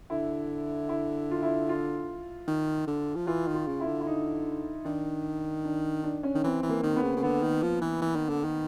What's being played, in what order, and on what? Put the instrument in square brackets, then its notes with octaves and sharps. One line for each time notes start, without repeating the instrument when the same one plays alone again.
[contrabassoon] D3 [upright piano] E4
[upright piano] E4
F4
E4
F4
[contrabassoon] D#3
D3
F3
[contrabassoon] E3 [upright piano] F4
[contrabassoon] D#3
[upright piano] F4
[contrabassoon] C#3
[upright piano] E4
[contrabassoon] D3
[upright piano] E4
D#4
[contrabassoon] D#3 [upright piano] D4
[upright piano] D4
D4
C#4
[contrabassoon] D#3
[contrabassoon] E3 [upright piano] C4
[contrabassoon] E3
[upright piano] A#3
[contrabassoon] D#3
[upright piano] B3
[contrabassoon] C#3
C#3
[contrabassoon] D3 [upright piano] B3
[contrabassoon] D#3
F3
E3
E3
D#3
D3
D#3